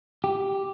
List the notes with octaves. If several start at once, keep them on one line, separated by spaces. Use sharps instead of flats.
G4